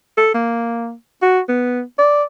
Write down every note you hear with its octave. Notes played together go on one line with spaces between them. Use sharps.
A4
A#3
F#4
B3
D5